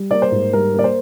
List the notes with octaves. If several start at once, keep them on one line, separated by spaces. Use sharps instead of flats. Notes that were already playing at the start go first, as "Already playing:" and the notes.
Already playing: G3
A#3 D5
C5
G#2
G3 A#4
A#3 D5
C5